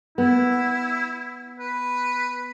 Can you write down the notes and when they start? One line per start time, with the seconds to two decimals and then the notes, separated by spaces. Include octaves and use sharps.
0.18 B3 E4
1.60 B4